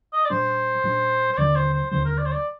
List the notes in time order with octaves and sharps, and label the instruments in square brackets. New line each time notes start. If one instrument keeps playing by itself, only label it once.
[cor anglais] D#5
D5
[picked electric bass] A#2 G3 D4 [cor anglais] C5
[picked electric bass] A#2 G3 D4
[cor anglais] C5
[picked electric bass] D#2 D3 G3 [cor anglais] D5
[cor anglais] C5
C5
[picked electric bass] D#2 D3 G3 [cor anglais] C5
[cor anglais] A#4
D5
C5
D5